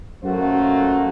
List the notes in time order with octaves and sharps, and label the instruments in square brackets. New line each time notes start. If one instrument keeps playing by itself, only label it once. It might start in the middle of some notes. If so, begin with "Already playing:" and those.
[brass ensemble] F#2 A3 A#3 F4 F#4 C5